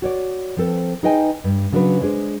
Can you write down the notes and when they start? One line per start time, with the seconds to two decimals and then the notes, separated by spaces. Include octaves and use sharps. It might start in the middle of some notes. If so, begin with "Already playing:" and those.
0.02 F#4 C#5 D5
0.57 F3 C4 A4 B4
1.03 D#4 G#4 B4 D#5 G5 G#5
1.44 G2
1.73 C#3 F#3 D4 A#4 B4
2.02 G#3 D4 G#4 C5